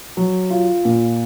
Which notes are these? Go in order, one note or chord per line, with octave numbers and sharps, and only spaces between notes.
F#3
F4
A#2